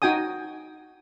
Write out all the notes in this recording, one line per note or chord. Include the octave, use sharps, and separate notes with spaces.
D#4 F#4 G5 G#5 D#6